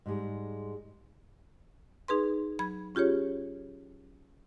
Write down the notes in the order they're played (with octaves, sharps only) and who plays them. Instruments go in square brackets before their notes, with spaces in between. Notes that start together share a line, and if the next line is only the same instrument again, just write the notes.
[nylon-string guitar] G#2 G3 G#3
[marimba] D#4 G#4 B4 C6
F#3 B5 G#6
C#4 F4 G4 G#4 C#5